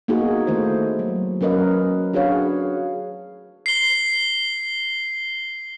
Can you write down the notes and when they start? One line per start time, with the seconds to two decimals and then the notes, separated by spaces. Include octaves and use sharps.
0.08 A#3 B3 D#4 F#4 G#4
0.47 D#3 A3 A#3 E4 C5
0.99 F#3
1.41 F#3 C#4 A#4 B4 D#5
2.13 D4 F#4 G#4 B4 C#5 F5
3.66 C7 G7